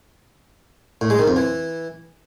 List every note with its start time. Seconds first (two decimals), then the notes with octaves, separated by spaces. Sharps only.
1.01 A2
1.10 G#3
1.19 D#3
1.28 F2
1.36 E3